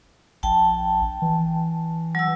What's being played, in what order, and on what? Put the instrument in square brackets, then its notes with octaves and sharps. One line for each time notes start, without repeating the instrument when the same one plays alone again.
[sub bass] A#1 [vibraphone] G5 A5
[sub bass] E3
[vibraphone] F#3 E6